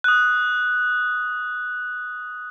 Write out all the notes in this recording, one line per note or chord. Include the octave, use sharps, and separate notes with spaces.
D#6 F#6